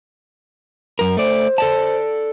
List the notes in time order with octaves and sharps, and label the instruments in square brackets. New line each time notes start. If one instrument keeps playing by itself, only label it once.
[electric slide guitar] F#2 A#4
[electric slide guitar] A3 D5 [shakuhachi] C5
[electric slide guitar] A4 D5 A5